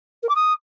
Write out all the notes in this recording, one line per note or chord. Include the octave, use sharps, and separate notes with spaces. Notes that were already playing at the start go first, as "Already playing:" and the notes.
A#4
D6
D#6